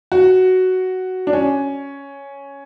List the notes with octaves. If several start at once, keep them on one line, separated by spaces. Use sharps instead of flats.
F#4
D4
C#4